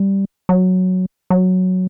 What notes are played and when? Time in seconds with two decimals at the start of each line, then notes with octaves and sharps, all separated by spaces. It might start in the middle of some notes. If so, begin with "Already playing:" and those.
Already playing: G3
0.49 F#3
1.30 F#3